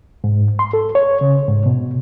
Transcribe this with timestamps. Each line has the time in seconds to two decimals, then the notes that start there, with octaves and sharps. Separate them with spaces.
0.24 G#2
0.59 C6
0.73 A4
0.95 C#5
1.21 C#3
1.48 G#2
1.66 B2